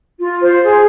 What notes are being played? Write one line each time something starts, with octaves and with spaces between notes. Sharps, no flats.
F4
C5
G#4